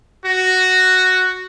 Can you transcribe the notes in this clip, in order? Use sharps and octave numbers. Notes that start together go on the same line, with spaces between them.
F#4